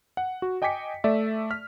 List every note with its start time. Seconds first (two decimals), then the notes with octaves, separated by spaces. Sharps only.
0.17 F#5
0.42 F#4
0.62 D#5 G5 G#5 D6 B6 C#7
1.04 A3 D5 E5
1.51 F6 B6